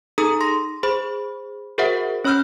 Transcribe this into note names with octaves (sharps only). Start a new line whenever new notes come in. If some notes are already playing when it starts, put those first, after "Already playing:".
D#4 G#4 A4 A#5 D#6
C6 A#6
G#4 C5 B5
F#4 G#4 A#4 C5 E5 F#5
C#4 C#5 B5 E6 F6 G6